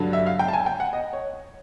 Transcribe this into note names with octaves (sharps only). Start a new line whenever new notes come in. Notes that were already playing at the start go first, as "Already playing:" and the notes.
Already playing: G2 D3 F#3
E5
F5
G5
A5
G#5
G5
F#5
D#5
C#5